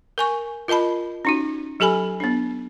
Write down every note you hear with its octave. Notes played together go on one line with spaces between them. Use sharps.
A#4 G#5 C#6
F4 A#4 D#5 A5 B5
C#4 D#4 F#4
F#3 G4 A4 G#5 B5
B3 D4